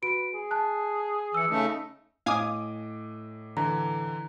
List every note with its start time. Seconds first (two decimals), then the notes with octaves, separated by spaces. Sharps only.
0.03 F#4 B4 D7
0.34 G#4
0.51 A5 F#6
1.34 E3 E6 C#7
1.50 C#3 A3 D#4
2.26 A2 D#5 F5 G#5 D6 D#6
3.57 D3 E3 A#5